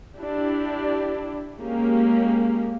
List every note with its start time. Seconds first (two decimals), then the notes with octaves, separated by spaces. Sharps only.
0.19 D4 E4 G4
1.61 G#3 A#3 C#4 G4